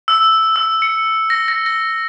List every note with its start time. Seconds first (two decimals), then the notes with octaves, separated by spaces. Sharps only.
0.08 E6
0.56 E6
0.82 C#7
1.30 A#6
1.48 A#6
1.66 A#6